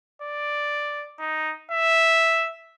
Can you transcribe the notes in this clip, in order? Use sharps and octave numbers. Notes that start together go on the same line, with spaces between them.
D5
D#4
E5